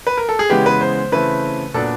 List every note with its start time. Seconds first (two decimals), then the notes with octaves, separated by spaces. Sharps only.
0.07 B4
0.17 A#4
0.29 A4
0.39 G#4
0.50 C#3 E3 G#3 B3 G4
0.66 B4
0.81 C5
1.12 C#3 E3 A3 C4 B4
1.74 A#2 F#3 B3 D4 A4